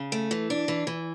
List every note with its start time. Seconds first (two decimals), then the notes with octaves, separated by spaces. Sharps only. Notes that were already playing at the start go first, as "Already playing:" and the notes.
Already playing: C#3
0.12 A3
0.31 E3
0.50 D4
0.68 E3
0.87 E3